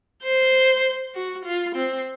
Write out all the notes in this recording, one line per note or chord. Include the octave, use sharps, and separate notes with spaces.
C5
F#4
F4
C4